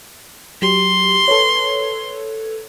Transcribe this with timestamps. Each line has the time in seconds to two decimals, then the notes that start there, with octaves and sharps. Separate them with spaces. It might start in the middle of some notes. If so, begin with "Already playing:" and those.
0.62 F#3 G4 C6
1.28 A4 B4 C#5